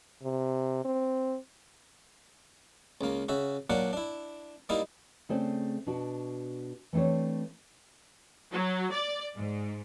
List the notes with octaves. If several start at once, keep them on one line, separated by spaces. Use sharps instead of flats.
C3
C4
C#2 A#3
C#3 F#4 E5
A#2 F#3 A#3 D4 F#5
D4 E4
G3 A#3 D#4 E4
C#3 A3 C4 G#4 C5 D5
B2 D4 F#4
E3 A3 C4 D4 C#5
F#3
D5
G#2